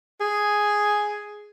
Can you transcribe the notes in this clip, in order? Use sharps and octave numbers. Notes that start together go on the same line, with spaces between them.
G#4